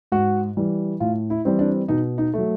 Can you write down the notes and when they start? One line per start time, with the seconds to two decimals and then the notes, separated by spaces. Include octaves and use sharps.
0.12 G#2 F#4
0.57 E3 G3
1.00 A2 F4
1.30 E4
1.45 E3 G3 C4
1.59 D4
1.88 B2 D#4
2.18 D#4
2.34 F#3 A3